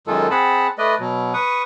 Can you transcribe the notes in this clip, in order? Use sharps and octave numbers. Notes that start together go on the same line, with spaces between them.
F#2 D#3 G#3 F4 A4
C4 G#4 F#5 A5 B5
A3 B4 D5 D#5
B2 F#3
B4 C#6 D#6